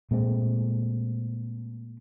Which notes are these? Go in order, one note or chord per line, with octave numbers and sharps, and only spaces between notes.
A#2 G#3 A3 C4